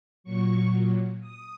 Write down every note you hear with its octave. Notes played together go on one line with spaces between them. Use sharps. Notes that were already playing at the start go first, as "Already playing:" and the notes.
A#2 F#3 C#6
D#6